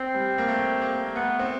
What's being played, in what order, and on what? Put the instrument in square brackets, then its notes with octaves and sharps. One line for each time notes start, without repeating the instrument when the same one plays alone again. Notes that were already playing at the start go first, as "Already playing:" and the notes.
Already playing: [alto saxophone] C4
[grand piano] G3
A#3
A3
A#3
[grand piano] A3 [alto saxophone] B3
[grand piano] C4